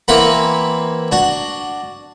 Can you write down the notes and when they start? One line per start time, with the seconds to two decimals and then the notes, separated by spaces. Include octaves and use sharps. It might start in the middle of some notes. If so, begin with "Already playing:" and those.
0.08 E3 A#3 C4 B4 F#5 B5
1.12 D4 F#4